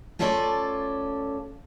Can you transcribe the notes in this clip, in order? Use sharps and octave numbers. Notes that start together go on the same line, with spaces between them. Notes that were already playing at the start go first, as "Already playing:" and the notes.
A3 C#4 F4 A4 C#5 D5